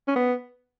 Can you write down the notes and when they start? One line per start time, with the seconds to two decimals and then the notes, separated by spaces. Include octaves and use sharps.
0.08 C#4
0.16 B3